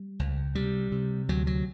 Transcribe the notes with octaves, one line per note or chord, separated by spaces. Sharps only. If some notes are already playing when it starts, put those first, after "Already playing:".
Already playing: G3
C#2
C3 G3
C3
D2 F#3
F#3